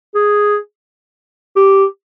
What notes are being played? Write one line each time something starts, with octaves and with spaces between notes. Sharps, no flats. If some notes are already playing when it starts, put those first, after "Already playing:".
G#4
G4